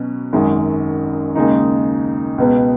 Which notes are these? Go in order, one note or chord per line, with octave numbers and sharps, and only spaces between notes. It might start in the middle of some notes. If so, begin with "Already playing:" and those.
Already playing: B2 F#3 C#4 B4
G#1 F#2 D#3 G#3
D#2 C#3 G#3 D#4
C#2 B2 B3